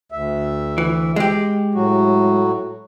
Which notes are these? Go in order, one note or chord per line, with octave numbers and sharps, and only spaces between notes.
D2 E5
E3
G#3 G4
A2 F#3 F#4